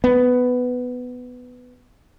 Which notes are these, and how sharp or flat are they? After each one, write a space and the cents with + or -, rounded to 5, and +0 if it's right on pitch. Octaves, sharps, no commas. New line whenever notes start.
B3 +10